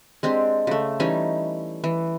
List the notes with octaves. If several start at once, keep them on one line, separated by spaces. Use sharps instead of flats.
G#3 C4 D4 G4
C#3 A3
E3 G3 C#4 D#4
E3